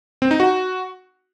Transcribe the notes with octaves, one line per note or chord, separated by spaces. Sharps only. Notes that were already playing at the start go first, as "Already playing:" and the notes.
C4
D#4
F#4